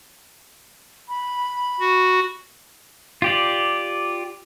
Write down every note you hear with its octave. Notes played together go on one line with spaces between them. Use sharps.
B5
F#4
F4 G4 D5